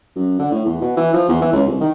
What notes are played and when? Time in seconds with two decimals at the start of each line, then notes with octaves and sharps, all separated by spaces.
0.16 F#2
0.39 D3
0.51 A2
0.65 E2
0.81 B2
0.97 E3
1.14 F3
1.29 E2
1.42 E3
1.53 C#2
1.66 C2
1.81 D#3